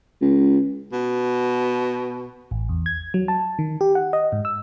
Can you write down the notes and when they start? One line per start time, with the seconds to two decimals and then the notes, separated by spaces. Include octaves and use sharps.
0.22 C#2
0.92 B2
2.51 A1
2.69 E2
2.86 G#6
3.14 F#3
3.28 A5
3.59 D#3
3.81 G4
3.95 F#5
4.13 D#5
4.32 G#2
4.45 E6